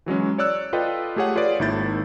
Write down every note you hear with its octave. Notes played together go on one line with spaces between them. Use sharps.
E3 F#3 G#3 C#4
C#5 D5 E6 F#6
F4 A4 B4 D5 D#5 G5
A3 G4 G#4 C#5 F#5
F4 G#4 B4 C#5 D5
G#1 D#3 A#3 E4 G6 A6